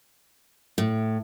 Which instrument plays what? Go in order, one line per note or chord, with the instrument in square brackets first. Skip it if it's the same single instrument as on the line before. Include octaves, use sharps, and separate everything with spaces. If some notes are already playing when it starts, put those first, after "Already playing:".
[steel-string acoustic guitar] A2